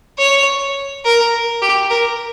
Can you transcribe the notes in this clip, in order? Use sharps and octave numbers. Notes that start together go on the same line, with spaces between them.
C#5
A#4
G4
A#4